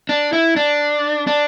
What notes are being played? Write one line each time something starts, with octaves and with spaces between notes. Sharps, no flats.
D4
E4
D4
D4